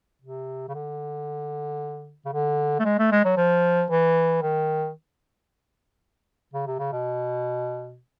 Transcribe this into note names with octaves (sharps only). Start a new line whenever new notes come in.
C3
C#3
D3
C#3
D3
A3
G#3
A3
G#3
F#3
F3
E3
D#3
C#3
C3
C#3
B2